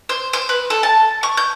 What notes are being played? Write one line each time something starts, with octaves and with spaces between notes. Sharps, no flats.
C5
C5
B4
A4
A5
C#6
G6